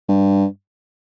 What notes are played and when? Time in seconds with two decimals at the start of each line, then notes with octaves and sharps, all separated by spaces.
0.08 G2